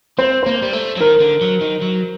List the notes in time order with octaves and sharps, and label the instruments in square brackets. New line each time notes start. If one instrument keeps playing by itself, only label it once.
[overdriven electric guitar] C4 [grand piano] C5
[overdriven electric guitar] A#3 [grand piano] C5
[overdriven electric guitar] G3
A3
F#3
[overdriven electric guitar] D#3 [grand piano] A#4
[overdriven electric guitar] D3
F#3
D#3
F#3